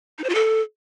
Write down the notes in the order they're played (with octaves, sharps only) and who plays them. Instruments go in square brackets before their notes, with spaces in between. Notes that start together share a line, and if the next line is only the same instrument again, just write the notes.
[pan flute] D#4
C5
F4
A4